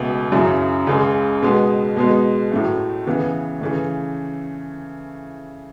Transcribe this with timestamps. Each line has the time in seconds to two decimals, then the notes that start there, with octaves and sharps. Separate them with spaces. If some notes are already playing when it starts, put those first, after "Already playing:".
Already playing: C#2 B2 A3
0.32 F#2 C#3 F#3 C#4 E4
0.87 C#2 C#3 G#3
1.42 B2 G#3 B3
1.96 B2 G#3 B3
2.52 A2 F#3 A3
3.06 C#3 E3 B3
3.61 C#3 E3 A3